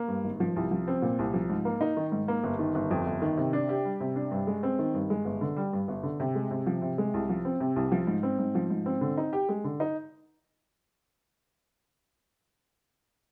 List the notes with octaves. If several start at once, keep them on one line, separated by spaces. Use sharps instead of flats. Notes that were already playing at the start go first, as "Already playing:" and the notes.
Already playing: A#3
G2
G#1
F3
C2
F3
C4
A#2
C2
F3
G#2
A#3
D#4
D#3
G#2
A#3
G1
D#3
G1
F2
G1
D#3
C3
D4
G4
G3
C3
D4
G2
G#3
C4
D#3
G2
G#3
G1
D3
G3
G2
G1
D3
C3
G#3
C3
F3
C3
G#3
C2
F3
C4
C3
C2
F3
G#2
C4
G#2
F3
G#2
C4
D3
D#4
G4
G#3
D3
D#4